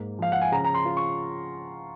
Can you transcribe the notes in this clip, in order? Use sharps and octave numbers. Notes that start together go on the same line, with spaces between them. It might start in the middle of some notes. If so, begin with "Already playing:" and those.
Already playing: G#2 A#3
F3 F5
F#5
G#5
C#3 A#5
A#5
C6
F4
C#6